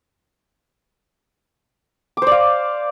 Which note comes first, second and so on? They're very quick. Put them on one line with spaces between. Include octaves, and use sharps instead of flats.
D6 C5 D5 F5